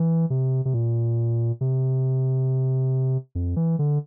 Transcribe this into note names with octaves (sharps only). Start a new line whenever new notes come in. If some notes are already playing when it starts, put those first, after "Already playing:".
Already playing: E3
C3
C3
A#2
C3
F2
E3
D3